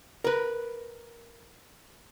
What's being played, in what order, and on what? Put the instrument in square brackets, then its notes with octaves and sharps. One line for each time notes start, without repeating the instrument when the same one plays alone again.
[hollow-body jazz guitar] A#4 B4